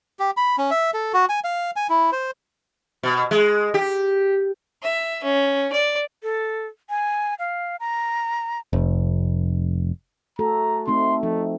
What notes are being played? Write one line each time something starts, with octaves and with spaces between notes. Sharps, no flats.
G4
B5
C#4
E5
A4
F#4
G#5
F5
G#5
E4
C5
B2
G#3
G4
E5
C#4
D5
A4
G#5
F5
A#5
F1
A3 F#4 A4 A#5
A3 C4 D#4 C6
F3 A3 D#4